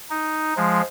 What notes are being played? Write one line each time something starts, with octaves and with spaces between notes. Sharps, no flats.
D#4
F3 G#3